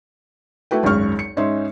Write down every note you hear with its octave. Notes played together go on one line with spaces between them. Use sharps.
A3 E4 F#4 B4 G5
G#1 C#2 F#2 G#3 C#6 F6
C#7
G#2 C#4 D#4 E5 C6